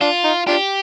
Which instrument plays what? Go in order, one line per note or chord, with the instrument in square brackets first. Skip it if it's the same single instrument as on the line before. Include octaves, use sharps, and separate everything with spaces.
[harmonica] D4 [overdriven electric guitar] F4
[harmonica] D#4
[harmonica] D4 F4 [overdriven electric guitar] G4